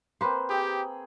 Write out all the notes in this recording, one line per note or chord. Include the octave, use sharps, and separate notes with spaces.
A#3 C4 B4 C5
G4 G#4 G5